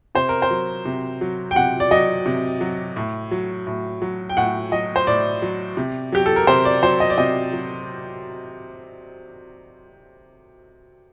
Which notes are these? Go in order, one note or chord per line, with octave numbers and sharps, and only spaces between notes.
C3 C5
A#4
C5
F#3
C3
F#3
G5
C3 F#5
D5
F#3 D#5
C3
F#3
A2
F#3
A2
F#3
G5
A2 F#5
F#3 D#5
C5
A2 D5
F#3
C3
F#3 G4
A4
A#4
C3 C5
D5
F#3 C5
D#5
D5
C3 D#5
F#3